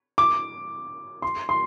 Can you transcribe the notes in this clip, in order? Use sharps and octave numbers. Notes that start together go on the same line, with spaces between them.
D6
C6
C6